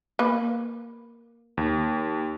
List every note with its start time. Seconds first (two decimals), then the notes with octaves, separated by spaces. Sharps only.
0.19 A#3 B4
1.57 D#2